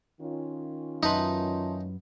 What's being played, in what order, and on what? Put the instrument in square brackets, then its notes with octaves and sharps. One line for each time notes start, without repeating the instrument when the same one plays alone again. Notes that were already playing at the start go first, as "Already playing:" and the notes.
[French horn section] D#3 C#4 F4
[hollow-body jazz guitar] F#2 B4 [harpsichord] D#4 [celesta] E5 A5 C6